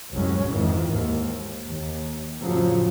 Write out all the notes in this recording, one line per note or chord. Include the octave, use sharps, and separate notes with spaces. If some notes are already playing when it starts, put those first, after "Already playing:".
C2 F#2 A2 F#3 G#3 C#4
F2 G#2 D#3 E3
D#2 G#2
D#2
F2 A2 C#3 F3 F#3